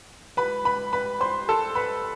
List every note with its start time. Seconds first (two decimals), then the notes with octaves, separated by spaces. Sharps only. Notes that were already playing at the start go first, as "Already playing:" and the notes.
0.37 B4 B5
0.65 B4 B5
0.93 B4 B5
1.21 C5 C6
1.49 A4 A5
1.75 B4 B5